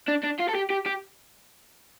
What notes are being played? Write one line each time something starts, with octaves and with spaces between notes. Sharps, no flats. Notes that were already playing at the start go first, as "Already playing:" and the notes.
D4
D4
F4
A4
G4
G4
G4